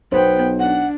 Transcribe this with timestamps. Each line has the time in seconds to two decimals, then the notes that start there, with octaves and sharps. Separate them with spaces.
0.12 B1 B3 C5 G5
0.59 D4 F#5